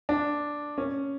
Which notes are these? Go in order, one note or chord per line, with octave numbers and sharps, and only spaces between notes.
D4
C#4